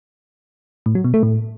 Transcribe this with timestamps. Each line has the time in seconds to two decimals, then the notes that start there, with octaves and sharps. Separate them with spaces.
0.86 A2
0.95 F#3
1.04 B2
1.14 A3
1.23 A2